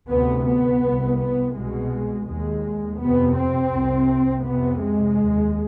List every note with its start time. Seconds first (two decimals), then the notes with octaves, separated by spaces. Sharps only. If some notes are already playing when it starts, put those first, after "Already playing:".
0.10 D2 C3 B3
0.46 B3
0.82 C2 C3
1.19 B3
1.54 C2 B2 G#3
2.27 D#2 G#3
3.00 F2 C3 B3
3.36 C4
3.72 C2 C3
4.45 F2 C3 B3
4.81 G#3
5.17 D#2